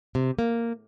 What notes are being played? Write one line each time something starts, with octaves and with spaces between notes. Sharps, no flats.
C3
A#3